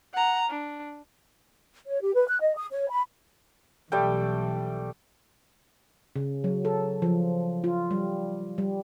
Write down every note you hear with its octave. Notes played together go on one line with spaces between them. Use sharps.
F#5 A#5
D4
C#5
G4
B4
F#6
D#5
D#6
C#5
B5
B1 E3 G3 A3 G5
C#3
F#3
A4
F3
F4
G3
G3